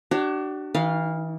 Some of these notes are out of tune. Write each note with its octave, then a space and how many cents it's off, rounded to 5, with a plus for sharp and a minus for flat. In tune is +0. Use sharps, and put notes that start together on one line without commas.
D4 +20 F#4 +45 C#5 +0
E3 -35 D#4 +20 F5 +0